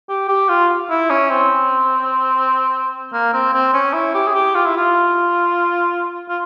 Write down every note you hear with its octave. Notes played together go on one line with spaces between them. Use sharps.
G4
G4
F4
E4
C#4
C4
A#3
C4
C4
C#4
E4
G4
G#4
G4
F4
E4
F4
F4